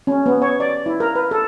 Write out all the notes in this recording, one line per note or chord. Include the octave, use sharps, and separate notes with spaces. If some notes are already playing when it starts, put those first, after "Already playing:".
C#4
B3
C#5
D5
E4
A#4
B4
A4